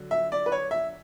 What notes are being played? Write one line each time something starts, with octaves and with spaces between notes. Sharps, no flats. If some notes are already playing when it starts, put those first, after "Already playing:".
Already playing: D3 F#3
E5
D5
B4
C#5
E5